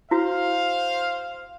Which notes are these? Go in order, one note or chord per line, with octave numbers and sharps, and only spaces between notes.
E4 F#4 C5 F5